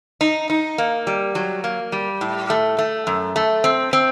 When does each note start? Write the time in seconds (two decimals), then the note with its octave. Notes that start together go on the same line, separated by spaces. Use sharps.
0.21 D#4
0.50 D#4
0.78 A#3
1.07 G3
1.35 F#3
1.64 A#3
1.92 G3
2.21 A2
2.50 A3
2.79 A3
3.07 F#2
3.36 A3
3.64 C4
3.93 C4